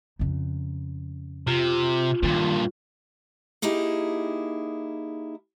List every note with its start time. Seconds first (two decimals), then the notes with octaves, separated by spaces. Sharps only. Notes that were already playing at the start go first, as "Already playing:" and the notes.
0.19 F2 C#3
1.47 C3 F4
2.23 G2 A#2 D#3
3.62 A#3 D#4 E4 G4 G#4